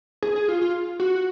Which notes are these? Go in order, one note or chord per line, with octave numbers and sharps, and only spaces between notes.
G#4
G#4
F4
F4
F#4